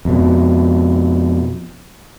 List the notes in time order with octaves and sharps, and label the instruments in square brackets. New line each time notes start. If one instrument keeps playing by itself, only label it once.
[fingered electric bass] F2 B2